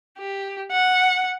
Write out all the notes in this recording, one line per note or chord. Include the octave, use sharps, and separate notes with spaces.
G4
F#5